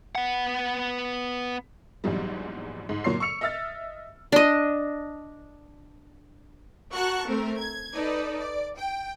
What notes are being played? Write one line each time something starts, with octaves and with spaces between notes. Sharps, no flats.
B3 F#5
A#1 E2 G#2 F#3 G3
G#2
A#2 F#3 C#5 C6 C7
C#6 E6 C#7 F7
D#5 E5 E6 F6 A6
D4 D#5
F#4 A#4 F#5 A5 C#6 F#6
A3 C4 A#4
G#6
D#4 A4 B4 D5
D5
G5